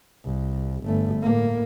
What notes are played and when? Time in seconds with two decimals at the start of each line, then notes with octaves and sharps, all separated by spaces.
0.25 C2
0.84 G1 A3
1.22 A2 A#3